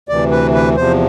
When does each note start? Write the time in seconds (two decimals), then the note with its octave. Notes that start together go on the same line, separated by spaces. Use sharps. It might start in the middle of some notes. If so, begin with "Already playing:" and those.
0.09 D2 C3 E3 D5
0.31 B4
0.54 B4
0.76 E2 C3 F3 C5